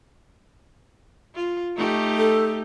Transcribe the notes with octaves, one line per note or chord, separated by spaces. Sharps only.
F4
A3 D#4 G4
A4